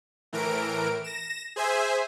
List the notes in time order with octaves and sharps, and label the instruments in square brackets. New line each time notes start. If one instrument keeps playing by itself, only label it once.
[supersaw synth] A2 E3 A#4 D7
A#6 E7
G#4 C5 E5 G#5